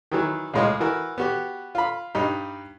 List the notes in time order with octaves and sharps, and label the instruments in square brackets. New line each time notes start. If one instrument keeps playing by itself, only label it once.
[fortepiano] D#3 E3 F#3
C#2 A2 G#3 F4 D#5
E3 F#4 A#4
B3 F#4 G4
F4 B5
G2 G3 D#4